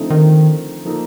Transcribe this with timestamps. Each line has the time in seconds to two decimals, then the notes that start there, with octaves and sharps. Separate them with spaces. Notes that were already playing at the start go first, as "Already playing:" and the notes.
Already playing: D3 F3 A3 C4 D#4
0.10 D#3
0.85 F3 A#3 D#4 A4